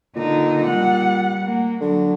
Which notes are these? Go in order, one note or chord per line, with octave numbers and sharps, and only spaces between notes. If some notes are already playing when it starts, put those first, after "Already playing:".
A#2 D3 D#4
G3 F#5
A#3
D3 F#3